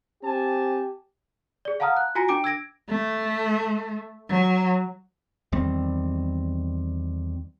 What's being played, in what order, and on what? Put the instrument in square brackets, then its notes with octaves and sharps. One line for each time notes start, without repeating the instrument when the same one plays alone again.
[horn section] C4 G#5 A5 [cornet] G4
[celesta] G#4 D5
F5 F#5 A5 A#5 D#6 F6
F#6
F4 F#4 G#5 A#5 A#6 C#7
D4 G5 D6 D7
E6 G#6 A#6 D7
[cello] A3
F#3
[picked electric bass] E2 D#3 G3 C4